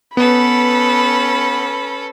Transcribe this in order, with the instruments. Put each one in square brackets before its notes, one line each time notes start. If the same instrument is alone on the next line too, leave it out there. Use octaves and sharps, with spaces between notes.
[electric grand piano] B3 [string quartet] C#4 A4 B4 [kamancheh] B5